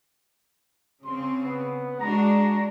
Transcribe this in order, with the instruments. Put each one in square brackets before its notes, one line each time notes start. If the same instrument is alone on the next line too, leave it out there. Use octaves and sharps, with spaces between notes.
[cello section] C#3 C4 [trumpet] C6
[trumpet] B3
[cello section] G#3 D4 F#4 [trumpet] A#5